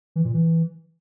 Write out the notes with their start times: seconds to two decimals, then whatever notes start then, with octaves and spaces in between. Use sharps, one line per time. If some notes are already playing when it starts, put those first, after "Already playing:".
0.16 E3
0.25 A#2
0.34 E3